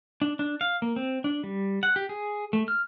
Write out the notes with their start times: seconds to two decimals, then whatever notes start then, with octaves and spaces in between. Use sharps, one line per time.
0.22 D4
0.39 D4
0.61 F5
0.82 A#3
0.96 C4
1.24 D4
1.44 G3
1.83 F#5
1.96 G4
2.09 G#4
2.53 A3
2.68 F6